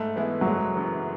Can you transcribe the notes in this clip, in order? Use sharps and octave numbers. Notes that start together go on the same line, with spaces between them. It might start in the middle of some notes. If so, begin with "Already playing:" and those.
Already playing: G#2 A3
E3 G#3 B3 E4
F#3
F#1 G#3
F#2 E3